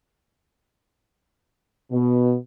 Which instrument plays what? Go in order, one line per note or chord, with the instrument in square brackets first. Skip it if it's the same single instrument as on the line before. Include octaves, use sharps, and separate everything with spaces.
[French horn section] B2